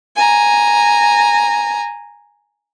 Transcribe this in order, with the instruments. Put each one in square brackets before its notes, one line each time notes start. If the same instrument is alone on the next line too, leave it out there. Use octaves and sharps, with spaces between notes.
[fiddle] G#5 A#5